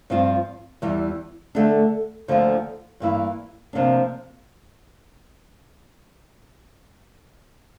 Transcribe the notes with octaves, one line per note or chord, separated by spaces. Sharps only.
G2 F3 C4 F4
E2 E3 G3
D3 A3 D4
D2 D3 F3 A#3 F4
G2 E3 A#3 E4
C3 F3 A#3 D4